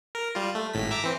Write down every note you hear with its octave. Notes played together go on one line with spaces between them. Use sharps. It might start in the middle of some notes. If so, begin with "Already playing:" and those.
A#4
G3 F4
A3
G#1 A2 B6
E5 A#5 D6
E3 C4